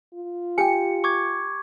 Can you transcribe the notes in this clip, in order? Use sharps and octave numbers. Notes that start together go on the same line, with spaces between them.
F4
G4 G5 G#5 C#7
C#6 D6 G#6